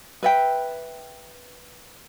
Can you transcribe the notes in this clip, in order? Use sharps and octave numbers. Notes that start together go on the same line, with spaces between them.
B4 E5 G5